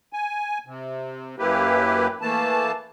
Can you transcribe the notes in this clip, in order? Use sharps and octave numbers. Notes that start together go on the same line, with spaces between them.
G#5
C3
F#2 A#3 E4 G4 B4
E3 A3 A#3 A5